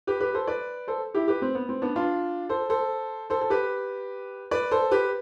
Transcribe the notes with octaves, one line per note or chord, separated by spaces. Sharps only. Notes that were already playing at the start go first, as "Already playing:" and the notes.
G4 B4
G4 B4
A4 C5
B4 D5
A4 C5
E4 G4
G4 B4
C4
B3
C4
B3 D4
D4 F4
A4 C5
A4 C5
A4 C5
A4
G4 B4
B4 D5
A4 C5
G4 B4